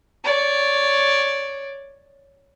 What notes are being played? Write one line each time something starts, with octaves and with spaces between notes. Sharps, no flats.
C#5 D5